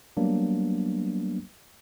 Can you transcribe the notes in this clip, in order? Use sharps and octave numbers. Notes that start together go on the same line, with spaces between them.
F#3 G3 A#3 B3 D4